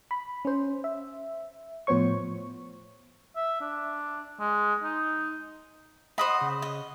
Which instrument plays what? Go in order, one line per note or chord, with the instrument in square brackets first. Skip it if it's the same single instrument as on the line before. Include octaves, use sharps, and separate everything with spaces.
[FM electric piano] B5
C#4 C5
E5
A2 F3 B3 C5 C#5 C#6
[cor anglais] E5
D4
G#3
D#4
[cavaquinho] C5 F#5 B5 [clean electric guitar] D#5
[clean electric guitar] C#3
[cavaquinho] D#5